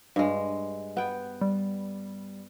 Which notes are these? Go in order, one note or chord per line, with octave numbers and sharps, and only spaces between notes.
G2 G#3
B3 G5
G3